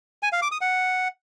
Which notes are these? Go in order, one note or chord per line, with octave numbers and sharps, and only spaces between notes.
G#5
F5
D6
D#6
F#5